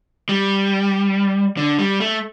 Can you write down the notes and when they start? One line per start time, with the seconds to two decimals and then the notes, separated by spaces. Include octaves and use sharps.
0.29 G3
1.57 D3
1.79 G3
2.00 A3